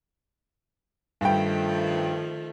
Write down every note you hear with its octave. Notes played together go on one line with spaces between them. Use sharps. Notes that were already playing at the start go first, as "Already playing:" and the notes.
G2 D#3 F3 A3 G5